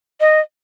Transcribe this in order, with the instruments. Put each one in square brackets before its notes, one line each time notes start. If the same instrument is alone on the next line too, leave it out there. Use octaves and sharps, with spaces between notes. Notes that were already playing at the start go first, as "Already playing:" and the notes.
[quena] D#5